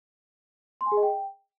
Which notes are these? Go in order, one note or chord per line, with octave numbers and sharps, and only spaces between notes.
C6
G#5
G#4
D#5
G5